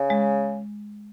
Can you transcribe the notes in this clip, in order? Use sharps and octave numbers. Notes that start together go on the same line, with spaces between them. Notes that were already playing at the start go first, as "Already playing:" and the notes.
Already playing: C#3
G#3